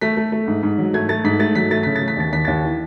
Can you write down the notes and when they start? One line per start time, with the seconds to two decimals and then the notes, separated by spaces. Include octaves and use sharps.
0.01 A3 B6
0.17 A3
0.32 A3
0.48 G#2
0.63 G#2
0.78 F#3
0.94 A3 G#6
1.09 A3 A6
1.24 G#2 B6
1.39 A3 A6
1.55 F#3 B6
1.71 A3 A6
1.83 C#3 B6
1.96 A6
2.02 A3
2.08 B6
2.17 D#2 A6
2.33 D#2 B6
2.45 D#2 A6
2.63 E3